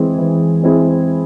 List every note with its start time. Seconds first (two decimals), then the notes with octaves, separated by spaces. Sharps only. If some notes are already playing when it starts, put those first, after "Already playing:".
Already playing: E3 G#3 C4 E4 G#4
0.18 E3
0.62 G#3 C4 E4 G#4